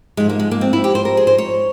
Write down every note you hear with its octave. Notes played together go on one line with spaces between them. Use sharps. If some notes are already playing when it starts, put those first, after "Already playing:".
G#2 F3 G#3
A#3
G#3
A#3
C4
E4
G4
C5
A#4
G#4
C5
C#5